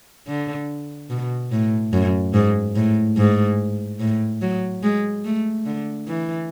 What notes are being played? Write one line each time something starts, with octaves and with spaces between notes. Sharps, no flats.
D3
B2
A2
F#2
G#2
A2
G#2
A2
F#3
G#3
A3
D3
E3